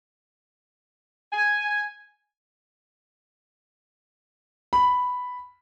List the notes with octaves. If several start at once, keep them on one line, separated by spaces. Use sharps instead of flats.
G#5
B5